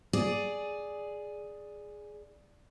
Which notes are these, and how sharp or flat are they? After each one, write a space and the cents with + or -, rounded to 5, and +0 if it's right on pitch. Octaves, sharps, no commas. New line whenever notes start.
G#4 +5 D5 +0